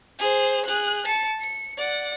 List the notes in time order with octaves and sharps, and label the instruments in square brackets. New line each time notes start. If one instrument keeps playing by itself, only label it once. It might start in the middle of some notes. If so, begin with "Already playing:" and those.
[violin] G#4 C5
G#4 F#6
A5 C#7
C#7
D5 F#5